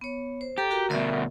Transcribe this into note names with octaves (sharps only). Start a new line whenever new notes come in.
B3 C#5
C5
G4 A4 A#5
F#4 A#4 A#5
D2 B2 A#4 D5 E5